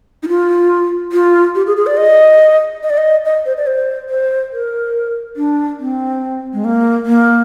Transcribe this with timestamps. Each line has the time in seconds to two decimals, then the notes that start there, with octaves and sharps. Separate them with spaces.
0.23 D#4
0.28 F4
1.12 F4
1.55 G4
1.66 G#4
1.77 G#4
1.87 D5
1.97 D#5
2.83 D#5
2.90 D5
2.97 D#5
3.25 D#5
3.46 C5
3.57 D5
3.67 C5
4.09 C5
4.53 A#4
5.36 D4
5.79 C4
6.53 G#3
6.65 A#3
7.06 A#3